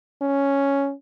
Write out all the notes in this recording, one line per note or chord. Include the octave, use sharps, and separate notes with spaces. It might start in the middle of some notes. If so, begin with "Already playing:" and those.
C#4